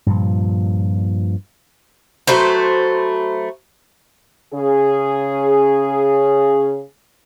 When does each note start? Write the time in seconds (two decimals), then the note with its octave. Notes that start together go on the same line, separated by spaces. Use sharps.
0.06 G2 A#2 F3
2.27 F#3 A3 B4 C5
4.53 C#3 G#4